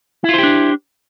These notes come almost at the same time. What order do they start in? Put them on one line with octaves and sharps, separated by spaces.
E4 F4 C5 G4 D4